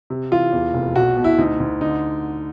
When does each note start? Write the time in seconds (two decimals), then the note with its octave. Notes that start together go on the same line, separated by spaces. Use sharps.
0.10 C3
0.31 E3 F4
0.53 E2
0.74 F1
0.96 B1 F#4
1.17 B2
1.24 E4
1.38 D2 D#4
1.60 D2
1.81 D3 D#4